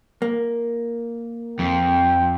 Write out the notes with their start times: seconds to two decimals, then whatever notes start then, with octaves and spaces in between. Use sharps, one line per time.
0.22 A#3
1.59 F2 G5